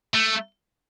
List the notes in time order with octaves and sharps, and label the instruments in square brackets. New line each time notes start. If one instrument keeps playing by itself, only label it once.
[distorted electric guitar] A3